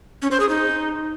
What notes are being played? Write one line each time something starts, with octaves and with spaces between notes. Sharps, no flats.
C#4
C5
G#4
D#4